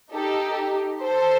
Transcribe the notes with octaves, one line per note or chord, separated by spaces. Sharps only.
D#4 G4 A4
A4 C5